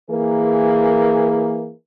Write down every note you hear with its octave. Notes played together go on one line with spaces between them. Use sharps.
E3 A#3 G#4 A#4